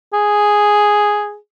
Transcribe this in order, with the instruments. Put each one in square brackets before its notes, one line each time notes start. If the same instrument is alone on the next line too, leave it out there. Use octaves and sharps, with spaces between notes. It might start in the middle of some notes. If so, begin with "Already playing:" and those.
[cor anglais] G#4